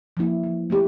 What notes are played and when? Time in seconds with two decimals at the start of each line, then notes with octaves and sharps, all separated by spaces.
0.17 F3 A#3 E4
0.44 F3
0.70 A3 E4 G4